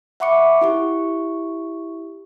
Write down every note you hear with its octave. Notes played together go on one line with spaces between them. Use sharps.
E5 F#5 B5 C#6 D6 C#7
E4 G4 C#6